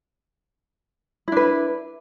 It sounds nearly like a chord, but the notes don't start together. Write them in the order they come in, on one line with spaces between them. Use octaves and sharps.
E4 D4 B4